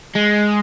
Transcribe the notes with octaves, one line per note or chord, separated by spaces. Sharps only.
G#3